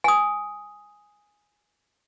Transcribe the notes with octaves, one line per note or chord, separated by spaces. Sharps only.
G#5 D#6